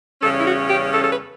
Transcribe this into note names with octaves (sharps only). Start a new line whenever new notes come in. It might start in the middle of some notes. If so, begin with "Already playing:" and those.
E2 C#3 G3 C#4 A4
E4
F#4
G4
A4
A4
B4